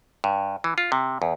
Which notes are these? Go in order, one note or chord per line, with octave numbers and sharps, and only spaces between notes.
G2
E3
F4
C3
E2